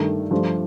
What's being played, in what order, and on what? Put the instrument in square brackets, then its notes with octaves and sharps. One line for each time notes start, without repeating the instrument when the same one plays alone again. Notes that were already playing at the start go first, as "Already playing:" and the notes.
Already playing: [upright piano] G2 D#3 A3
G2 F3 A3